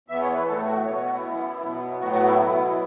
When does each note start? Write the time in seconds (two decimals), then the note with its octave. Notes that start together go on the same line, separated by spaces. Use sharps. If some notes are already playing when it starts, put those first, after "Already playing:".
0.08 E2 E3 B3 E5
0.21 C#5
0.35 B4
0.47 A2 A3 A4
0.66 F#4
0.85 B2 B3 C#5
0.96 C#5
1.04 F#4
1.14 E4
1.23 F#2 E3 B3
1.61 B2 F#3 B3
2.00 A2 F#3 B3 F#4
2.12 F#4
2.25 E4
2.39 B2 F#3 B3